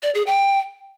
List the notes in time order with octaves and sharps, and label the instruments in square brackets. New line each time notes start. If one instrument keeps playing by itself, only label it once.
[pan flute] D5
G#4
G5